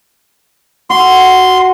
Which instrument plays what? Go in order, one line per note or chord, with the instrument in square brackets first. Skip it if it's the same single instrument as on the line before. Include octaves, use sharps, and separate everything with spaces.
[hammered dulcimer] F#4 [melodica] C6